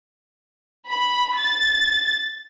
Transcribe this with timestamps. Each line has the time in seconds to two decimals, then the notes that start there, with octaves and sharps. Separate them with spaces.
0.89 B5
1.37 A6